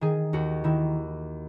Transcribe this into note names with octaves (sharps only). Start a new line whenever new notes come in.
D#3 G#4
D#2 F#4
D#3 E4